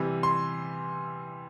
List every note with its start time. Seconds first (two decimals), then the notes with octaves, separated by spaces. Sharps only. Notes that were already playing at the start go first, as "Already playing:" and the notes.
Already playing: C3 E3 G3
0.23 C6